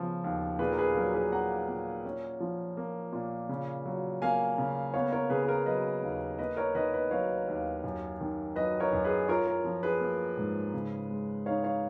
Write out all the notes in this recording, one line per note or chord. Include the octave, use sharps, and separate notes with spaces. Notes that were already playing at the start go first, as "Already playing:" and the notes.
Already playing: C#3 F3 B3
D#2
A#2 G#4 B4
A#4
G#4 B4
F#3 A#4
G#4 B4
A#3 F#5 A#5
A#2
C#4
F3
A#3
A#2
C#3
F#3
A#3 F5 G#5
C#3
B3 C#5 F5
A#4 C#5
C#3 G#4 B4
G#4
A#4
F#3 B4 D#5
D#2
A#3 B4 D#5
A#4 C#5
D#3 B4 D#5
B4 D#5
F#3 C#5 F5
D#2
F#2
D#3
F#3 B4 D#5
A#4 C#5
F#2
G#4 B4
F4 A#4 C#5
A#4
F3
G#4 B4
A#3
G#2
C#3
G#3
D#4 C#5 F5
C#5 F5